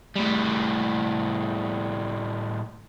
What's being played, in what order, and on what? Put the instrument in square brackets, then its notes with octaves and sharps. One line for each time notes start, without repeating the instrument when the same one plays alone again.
[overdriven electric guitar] A2 G3